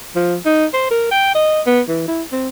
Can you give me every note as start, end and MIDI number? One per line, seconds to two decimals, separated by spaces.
0.16 0.36 53
0.46 0.66 63
0.74 0.89 72
0.91 1.09 70
1.11 1.31 79
1.35 1.61 75
1.66 1.81 59
1.88 2.05 52
2.08 2.23 64
2.32 2.48 60